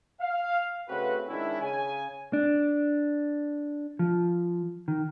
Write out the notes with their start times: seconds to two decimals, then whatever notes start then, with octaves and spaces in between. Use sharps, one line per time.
0.21 F5
0.89 C#3 A3 C4 F#4 B4
1.29 D#3 G#3 C#4 D4 E4
1.61 C#3 G#5
2.33 D4
3.99 F3
4.88 D#3